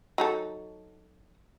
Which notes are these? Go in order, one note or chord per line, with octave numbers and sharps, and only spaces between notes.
F#3 D#4 A4